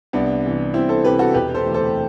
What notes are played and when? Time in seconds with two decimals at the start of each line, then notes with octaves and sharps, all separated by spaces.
0.13 C2 B3 D4
0.44 C3 E3
0.74 C2 C4 E4
0.89 A4 C5
1.04 C3 E3 G4 B4
1.19 F#4 A4
1.34 E1 G4 B4
1.54 A4 C5
1.65 D2 C3 E3
1.74 A4 C5